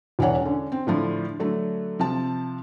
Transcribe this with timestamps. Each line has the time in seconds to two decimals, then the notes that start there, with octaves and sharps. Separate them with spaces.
0.19 E1 E3 D4 C#5 F#5
0.42 D3 C#4
0.72 C4
0.87 A2 D3 F3 E4
1.40 D3 F#3 A3
1.99 C3 F3 A5